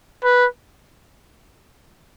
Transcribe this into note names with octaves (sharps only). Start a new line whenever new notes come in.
B4